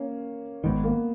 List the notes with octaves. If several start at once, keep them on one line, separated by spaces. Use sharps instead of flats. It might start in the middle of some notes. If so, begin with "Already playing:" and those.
Already playing: A#3 C#4
G#1 G#2 D#3 B3
A#3